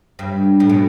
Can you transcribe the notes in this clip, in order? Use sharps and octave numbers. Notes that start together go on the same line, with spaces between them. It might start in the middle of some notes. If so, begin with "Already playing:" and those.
G2
A2
B2